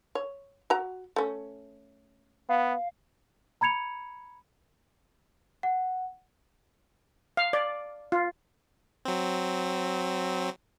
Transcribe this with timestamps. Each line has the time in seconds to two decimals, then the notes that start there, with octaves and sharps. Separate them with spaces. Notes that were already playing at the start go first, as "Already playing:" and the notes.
0.15 C#5
0.70 F#4 A#5
1.16 A3 C#4
2.49 B3 F5
3.61 A#5 B5 G#6 C#7 F7
5.63 F#5
7.37 F5
7.53 D5
8.12 F4
9.05 F#3 C4